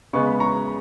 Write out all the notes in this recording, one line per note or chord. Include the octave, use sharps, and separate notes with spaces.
C#3 G#3 B3 C#6
B5
A#5 C#6